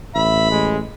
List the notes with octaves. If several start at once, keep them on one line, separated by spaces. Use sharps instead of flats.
A1 E5 B5
G#3